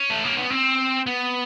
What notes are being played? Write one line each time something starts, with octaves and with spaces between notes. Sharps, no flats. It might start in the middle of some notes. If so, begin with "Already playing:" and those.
Already playing: C#4
A3
A#3
B3
C4
B3